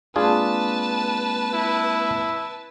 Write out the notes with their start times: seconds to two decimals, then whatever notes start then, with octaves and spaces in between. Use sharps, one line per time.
0.16 G#3 A#3 C4 D4 F4 G#4 B4 A5
1.54 E4